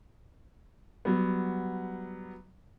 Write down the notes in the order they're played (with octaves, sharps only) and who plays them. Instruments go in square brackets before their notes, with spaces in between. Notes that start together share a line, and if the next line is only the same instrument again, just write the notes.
[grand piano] F#3 G3 B3